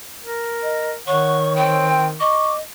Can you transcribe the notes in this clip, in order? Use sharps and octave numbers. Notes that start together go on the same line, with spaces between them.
A#4
D#5
D#3 C#5 F#5 C#6
C4 G5
D#5 C#6 D6